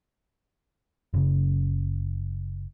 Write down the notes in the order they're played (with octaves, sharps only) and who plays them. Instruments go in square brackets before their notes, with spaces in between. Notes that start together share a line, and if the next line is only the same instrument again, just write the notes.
[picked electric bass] F#1 C#3